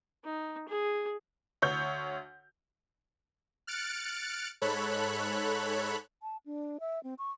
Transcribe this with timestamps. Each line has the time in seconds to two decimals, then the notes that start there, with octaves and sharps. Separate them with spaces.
0.24 D#4
0.68 G#4
1.62 D2 C#5 G6
3.67 F6 F#6 A6 C#7 D7
4.61 G#2 A4 C#5 B5 F#6
6.23 A5
6.46 D4
6.80 E5
7.03 C4
7.18 C#6